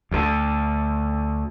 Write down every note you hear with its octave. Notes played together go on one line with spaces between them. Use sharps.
D2 D3